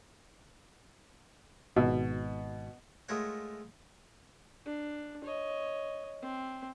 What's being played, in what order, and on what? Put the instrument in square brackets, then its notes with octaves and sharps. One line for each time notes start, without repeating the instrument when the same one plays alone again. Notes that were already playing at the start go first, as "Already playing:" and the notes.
[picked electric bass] G#1 [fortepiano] B2
[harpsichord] G#3 A3 F4 A#4 C#5 F#5
[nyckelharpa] D4
C#5 D#5
C4